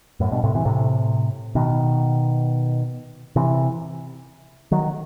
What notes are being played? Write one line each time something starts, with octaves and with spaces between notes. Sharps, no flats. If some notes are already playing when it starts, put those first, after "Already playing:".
F#2 A2
G2 B2
A2 C3
C3 E3
A2 C3
B2 D#3
C3 E3
D#3 F#3